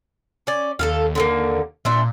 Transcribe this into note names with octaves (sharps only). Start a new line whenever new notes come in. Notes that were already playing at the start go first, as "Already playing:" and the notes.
C#4 D5
D#2 A4 A#4 F5
D3 F#3 A#3
A#2 D4 C5 E5